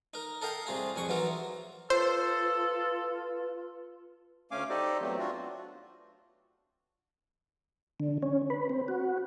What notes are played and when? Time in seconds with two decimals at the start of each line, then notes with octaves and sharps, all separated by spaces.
0.14 D#4 A#4
0.41 A4 A#4 D#5 F5 G5
0.67 C2 C3 F4 G#4
0.96 C2 F2 G#4 C#6
1.09 E3 F#3 D#4 F4 A#4 E5
1.90 F4 A4 B4 C5
4.51 D2 A3 C#4 F5 G#5 D6
4.70 D#4 G4 A4 C5 D5 D#5
5.01 E2 E3 F#3 A3 C4
5.19 D4 F4 F#4
8.00 D3
8.22 C#4
8.50 B4
8.69 C4
8.88 F#4